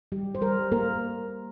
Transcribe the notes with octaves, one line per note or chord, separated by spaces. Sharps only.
G3 G4
C5
G3 A#4
A#3 A#4